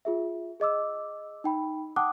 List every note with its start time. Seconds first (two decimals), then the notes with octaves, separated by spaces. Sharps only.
0.05 F4 G#4 E5
0.60 G#4 D#5 D6 E6
1.44 D#4 G5 B5
1.96 F#5 G5 A5 D6 D#6 F#6